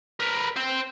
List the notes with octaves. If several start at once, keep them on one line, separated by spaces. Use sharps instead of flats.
A#4 B4
C5 G5